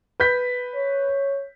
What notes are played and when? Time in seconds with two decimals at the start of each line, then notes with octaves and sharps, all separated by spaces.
0.20 B4 G6 B6
0.75 C#5